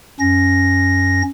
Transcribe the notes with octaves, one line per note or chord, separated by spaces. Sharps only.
F#2 C#4 A#6